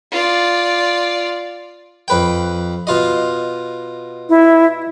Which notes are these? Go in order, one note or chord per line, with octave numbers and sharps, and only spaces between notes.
F4 D5
F2 B4 G5
B2 F4 D#5
E4